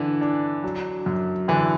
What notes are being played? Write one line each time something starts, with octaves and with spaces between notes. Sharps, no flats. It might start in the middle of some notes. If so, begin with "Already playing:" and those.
Already playing: D3 E3 D4
D4
F#3
F#2
D3 E3